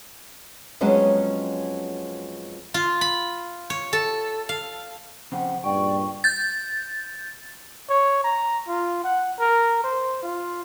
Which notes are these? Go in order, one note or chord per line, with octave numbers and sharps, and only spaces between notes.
F2 F#3 G#3 B3 C#4 D#5
F4
B5
C#5
A4
F5
F2 C#3 C4 F#5
C#2 G2 A#2 D5 G5 C#6
G6 A6
C#5
A#5
F4
F#5
A#4
C5
F4